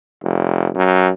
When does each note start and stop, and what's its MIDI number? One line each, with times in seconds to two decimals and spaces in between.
0.23 0.70 29
0.75 1.10 42